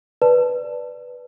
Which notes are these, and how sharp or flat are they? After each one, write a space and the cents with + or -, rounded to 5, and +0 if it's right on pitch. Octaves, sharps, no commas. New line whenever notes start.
B4 +0 D5 +0 A5 +0